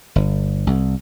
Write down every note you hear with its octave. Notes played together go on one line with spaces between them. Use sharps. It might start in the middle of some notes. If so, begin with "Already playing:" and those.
G1
C2